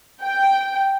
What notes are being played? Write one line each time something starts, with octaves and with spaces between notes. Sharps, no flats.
G5